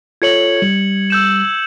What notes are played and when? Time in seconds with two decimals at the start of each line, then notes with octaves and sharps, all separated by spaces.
0.22 F4 A4 C#5 G#6 C#7 F#7
0.62 G3 F#7
1.10 E6 G6 E7